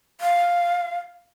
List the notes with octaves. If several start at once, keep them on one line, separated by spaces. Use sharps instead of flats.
F5